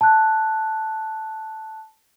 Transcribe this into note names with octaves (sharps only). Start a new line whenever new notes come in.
A5 F#6